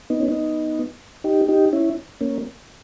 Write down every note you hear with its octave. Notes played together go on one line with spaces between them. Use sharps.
B3 D#4
C#4
B3 D#4
D#4 G4
D#4 G4
C#4 E4
A#3 C#4